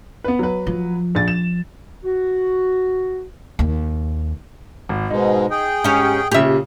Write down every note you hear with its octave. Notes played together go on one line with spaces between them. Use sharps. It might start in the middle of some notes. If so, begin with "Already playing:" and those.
B3 B4
F#3 B4
F3
A#1 A6
E7
F#4
D#2
G#1
G#2 B2 G#3 D#4
G#4 G5
G#2 C#4 G4 G#5
A#2 C#3 G4 E5